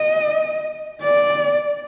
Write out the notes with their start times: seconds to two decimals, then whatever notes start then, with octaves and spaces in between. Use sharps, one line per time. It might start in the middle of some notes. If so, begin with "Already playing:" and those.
Already playing: D#5
1.02 D5